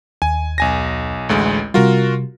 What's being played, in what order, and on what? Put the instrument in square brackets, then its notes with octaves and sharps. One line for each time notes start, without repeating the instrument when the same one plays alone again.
[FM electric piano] D#2 [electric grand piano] G#5
[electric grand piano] B1 G#5 A#6
A1 D2 G#3
[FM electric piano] C3 G3 [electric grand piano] F4 F#4 A#4